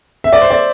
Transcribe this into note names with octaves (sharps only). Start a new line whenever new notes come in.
E5
D5
C5
D5